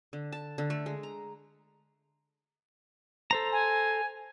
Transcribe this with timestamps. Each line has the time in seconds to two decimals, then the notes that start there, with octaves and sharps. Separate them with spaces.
0.13 D3
0.32 A5
0.58 D3
0.70 A3
0.86 G#3
1.03 A#5
3.31 A4 C5 A#5
3.52 G#5